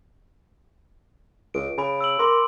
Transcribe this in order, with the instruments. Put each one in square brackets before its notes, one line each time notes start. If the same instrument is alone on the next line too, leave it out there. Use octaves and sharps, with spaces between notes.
[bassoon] C#2 [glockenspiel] D7
[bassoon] C#3 [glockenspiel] G#5 B5 D7
[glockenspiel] E6 D7 F#7
[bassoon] A#4 [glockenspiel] C6 D6